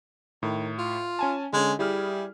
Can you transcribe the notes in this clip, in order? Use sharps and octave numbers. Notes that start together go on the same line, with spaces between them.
A2 D#3
F4
C#4 G#5 A5
D3 G#3 C#4
G3 E4 G#4 F6